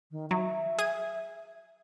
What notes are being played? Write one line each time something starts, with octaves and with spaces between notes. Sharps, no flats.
D#3
F#3 E5
G#4 D#7